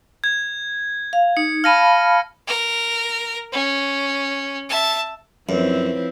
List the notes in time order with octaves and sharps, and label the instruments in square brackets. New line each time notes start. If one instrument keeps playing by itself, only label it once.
[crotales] G#6
[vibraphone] F5
[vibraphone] D#4 [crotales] C#7
[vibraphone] F5 A5 B5 [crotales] F6 A#6 D#7
[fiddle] A#4
C#4
E5 A5
[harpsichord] F#2 [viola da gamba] F3 C4 E4 [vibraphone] B4 C#5